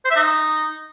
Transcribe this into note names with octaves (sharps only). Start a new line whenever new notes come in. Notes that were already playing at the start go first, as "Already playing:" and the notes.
C5
E5
D#4